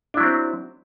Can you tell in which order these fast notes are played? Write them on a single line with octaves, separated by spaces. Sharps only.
D4 E4 F#3 C4